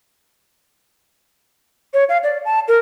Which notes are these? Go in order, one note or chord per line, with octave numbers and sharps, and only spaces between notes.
C#5
F5
D5
A5
A#4